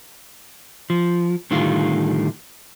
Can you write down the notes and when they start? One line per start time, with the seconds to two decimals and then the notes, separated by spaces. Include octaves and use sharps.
0.90 F3
1.51 A2 D3 D#3 G3 F4